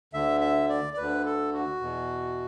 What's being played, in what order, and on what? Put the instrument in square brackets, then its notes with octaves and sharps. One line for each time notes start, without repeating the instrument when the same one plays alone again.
[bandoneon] D2 D3 E5
E5
D5
D5
D2 D3 B4
A4
F#4
E2 B2